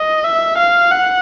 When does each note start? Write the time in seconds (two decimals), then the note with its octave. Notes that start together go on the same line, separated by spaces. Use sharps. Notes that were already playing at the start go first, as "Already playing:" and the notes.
Already playing: D#5
0.24 E5
0.58 F5
0.91 F#5